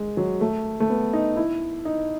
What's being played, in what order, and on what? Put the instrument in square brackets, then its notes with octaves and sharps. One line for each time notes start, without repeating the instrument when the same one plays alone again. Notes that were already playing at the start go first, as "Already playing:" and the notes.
Already playing: [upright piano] G#3
F#3
A3
A3
B3
D#4
E4
D#4